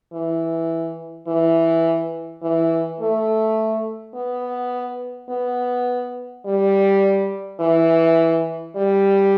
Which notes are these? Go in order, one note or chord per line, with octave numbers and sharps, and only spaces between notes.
E3
E3
E3
A3
B3
B3
G3
E3
G3